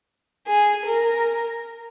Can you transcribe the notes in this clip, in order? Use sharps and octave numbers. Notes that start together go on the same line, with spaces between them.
G#4
A#4